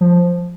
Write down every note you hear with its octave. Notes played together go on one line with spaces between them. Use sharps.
F3